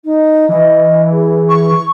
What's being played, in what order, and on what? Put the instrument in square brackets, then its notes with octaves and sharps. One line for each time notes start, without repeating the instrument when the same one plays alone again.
[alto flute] D#4
[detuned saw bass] E3 [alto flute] D#5
[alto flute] G#4
[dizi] C#6